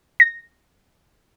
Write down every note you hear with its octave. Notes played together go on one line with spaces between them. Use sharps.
A#6